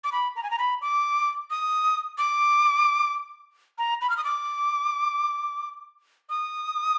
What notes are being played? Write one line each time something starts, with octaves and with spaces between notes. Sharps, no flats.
D6
B5
A#5
G#5
A#5
B5
D6
D#6
D6
A#5
B5
F6
D#6
D6
D#6